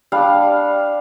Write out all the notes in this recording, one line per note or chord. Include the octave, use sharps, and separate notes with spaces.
G3 D4 F5